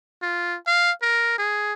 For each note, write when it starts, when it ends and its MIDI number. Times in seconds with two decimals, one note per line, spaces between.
0.22 0.57 65
0.67 0.91 77
1.02 1.37 70
1.38 1.73 68